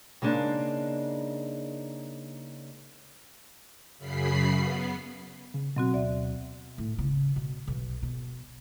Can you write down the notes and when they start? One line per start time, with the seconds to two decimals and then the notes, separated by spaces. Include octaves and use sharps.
0.22 C#3 G#3 A#3 D4 D#4
3.98 F#2 C#3 B5 C7
4.59 B3
5.54 C#3
5.76 B2 F#3 C4 F#4
5.93 D2 D5 E5
6.78 A2
6.98 C#3
7.36 B2
7.68 B1
8.03 B2